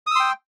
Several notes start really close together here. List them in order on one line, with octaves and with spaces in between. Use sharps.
D#6 E6 C6 G5